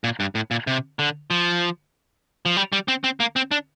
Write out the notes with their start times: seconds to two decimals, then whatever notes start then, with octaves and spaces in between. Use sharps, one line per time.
0.04 A#2
0.20 G2
0.35 A2
0.51 A#2
0.67 C3
0.99 D3
1.31 F3
2.46 F3
2.57 G3
2.73 G3
2.88 C4
3.04 C4
3.20 A#3
3.36 C4
3.51 D4